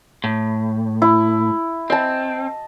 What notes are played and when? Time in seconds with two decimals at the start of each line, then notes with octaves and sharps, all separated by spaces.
0.24 A2
1.02 E4
1.90 C4 D#5 A5